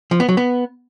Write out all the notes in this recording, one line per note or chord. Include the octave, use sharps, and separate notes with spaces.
F3
B3
F#3
B3